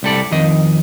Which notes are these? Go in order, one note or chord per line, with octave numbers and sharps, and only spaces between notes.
C2 G3 A4 D5
F2 D#3 D#5